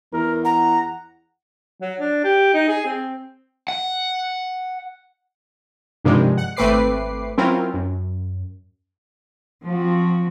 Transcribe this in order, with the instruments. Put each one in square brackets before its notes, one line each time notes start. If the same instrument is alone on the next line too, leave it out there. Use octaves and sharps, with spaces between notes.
[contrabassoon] E2 [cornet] A#4
[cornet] F#5 [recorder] A#5
[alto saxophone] F#3
D4
G4
D#4
G#4
C4
[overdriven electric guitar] F#5
[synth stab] G2 C3 D#3 F3 G3 G#3
F#5
G#1 A3 C4 B4 D6 C7
F#3 C4 C#4 E4 F4 A#4
F#2
[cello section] F3 C4 F#4